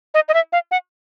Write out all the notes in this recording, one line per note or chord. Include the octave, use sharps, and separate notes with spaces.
D#5
D#5
E5
F5
F#5